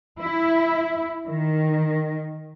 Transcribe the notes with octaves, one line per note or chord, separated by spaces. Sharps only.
E4
D#3